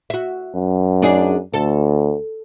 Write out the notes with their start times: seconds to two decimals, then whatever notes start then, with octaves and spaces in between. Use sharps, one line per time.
0.10 F#4 E5
0.54 F#2
1.02 D4 D#4 G#4
1.54 D2 A4